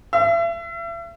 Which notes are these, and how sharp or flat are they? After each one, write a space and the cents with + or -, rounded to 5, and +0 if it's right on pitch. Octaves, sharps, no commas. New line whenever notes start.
E5 +40